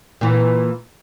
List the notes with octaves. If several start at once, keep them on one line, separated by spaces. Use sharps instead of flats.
A#2 E3